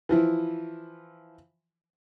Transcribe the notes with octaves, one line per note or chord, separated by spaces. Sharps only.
E3 F3 E4